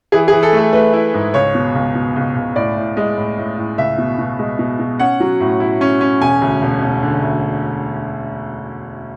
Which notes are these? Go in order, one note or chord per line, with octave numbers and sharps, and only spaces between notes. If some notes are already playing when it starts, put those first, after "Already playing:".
E3 G#4
G#4
E3
A4
A3
A4
A3 B4
E4
G#2
C#2 C#5
B2
C#2
B2
C#2
C#2
A2 D5
A2
G#3
A2
A2
A2
C#2 E5
B2
B2
G#3
B2
B2
C#4 F#5
F#3
A2
E4
C#4
C#4
E1 G#5
D2
E1
E1
D3
D2